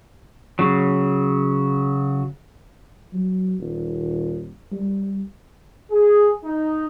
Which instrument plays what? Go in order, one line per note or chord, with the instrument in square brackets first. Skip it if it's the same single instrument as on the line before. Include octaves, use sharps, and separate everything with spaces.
[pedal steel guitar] C#3 F#3
[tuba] F#3
D#1
G3
[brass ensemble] G#4
D#4